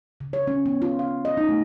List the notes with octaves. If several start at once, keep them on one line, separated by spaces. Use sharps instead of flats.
C#3
C#5
C#4
B3
F4
F5
D#5
D#4
A3